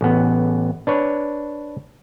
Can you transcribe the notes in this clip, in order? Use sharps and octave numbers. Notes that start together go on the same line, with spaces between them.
A1 B3
D4 B4 C#5